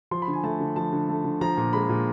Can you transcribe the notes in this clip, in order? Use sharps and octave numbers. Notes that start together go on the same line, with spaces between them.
F3 C6
B5
D3
G#5
A3 A5
D3
F3 A5
D3
A3
D3
F3 A#5
A#2
G#3 B5
A#2